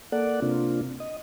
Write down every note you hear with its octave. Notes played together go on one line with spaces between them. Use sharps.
A#3 A4 D5 F#5
C3 A#3 C4 D4 F4
D#5